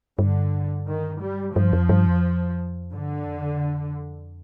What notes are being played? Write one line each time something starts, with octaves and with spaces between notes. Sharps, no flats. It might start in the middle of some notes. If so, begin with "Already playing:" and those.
G2 D3
D#3
G3
G2 F3
F2
G2
F2
G2 D3
F2